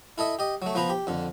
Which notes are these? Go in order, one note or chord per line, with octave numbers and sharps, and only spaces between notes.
E4 A4 D#5 E5
G4 D#5
F#3 A3
F3 B3 C5 A#5 B5
G4
F2 D3